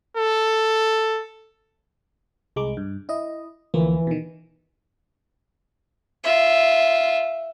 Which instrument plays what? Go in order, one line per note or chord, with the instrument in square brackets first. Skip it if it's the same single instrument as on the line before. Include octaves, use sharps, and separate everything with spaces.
[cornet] A4
[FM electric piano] C2 G#3 D6
G2
E4 D#5
[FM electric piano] D2 F3 A#3 [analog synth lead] E3
[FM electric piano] B2 D#3
[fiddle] F4 E5